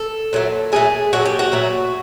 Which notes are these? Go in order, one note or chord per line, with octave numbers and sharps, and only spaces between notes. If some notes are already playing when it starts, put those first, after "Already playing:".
Already playing: A4
A#2 F#3 A3
A#2 F#3 A3 G#4
A#2 F#3 A3 F#4
G4
F#4
A#2 F#3 A3